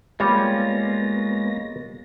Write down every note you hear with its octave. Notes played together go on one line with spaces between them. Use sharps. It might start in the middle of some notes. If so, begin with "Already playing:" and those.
G3 G#3 A#3 B3 F4 C#5 A#6